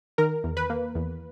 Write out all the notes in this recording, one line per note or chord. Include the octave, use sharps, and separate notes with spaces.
D#3 A#4
E2
B4
A#3
E2